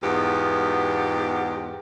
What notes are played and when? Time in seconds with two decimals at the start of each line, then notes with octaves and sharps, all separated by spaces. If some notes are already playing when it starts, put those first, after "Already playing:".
0.03 E2 G#2 B3 F4 G4